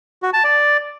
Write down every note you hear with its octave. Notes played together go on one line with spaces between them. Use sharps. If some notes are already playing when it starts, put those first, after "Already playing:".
F#4
A5
D5